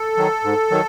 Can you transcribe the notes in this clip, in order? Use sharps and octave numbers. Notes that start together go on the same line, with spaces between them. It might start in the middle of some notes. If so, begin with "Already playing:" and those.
Already playing: A4
D#3 F#3
G#2
D#3 F#3